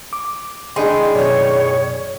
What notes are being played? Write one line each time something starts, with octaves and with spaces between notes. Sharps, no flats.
D6
A2 D#3 D4 G#4 D#5 C6
F#2 B2 C#5 D5